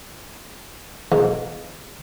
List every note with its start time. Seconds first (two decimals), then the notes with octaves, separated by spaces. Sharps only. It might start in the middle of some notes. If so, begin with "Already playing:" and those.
1.12 B1 E2 G#2 A#3